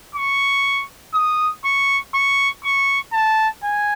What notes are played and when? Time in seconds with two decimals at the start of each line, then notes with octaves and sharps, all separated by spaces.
0.15 C#6
1.15 D#6
1.64 C#6
2.14 C#6
2.64 C#6
3.13 A5
3.63 G#5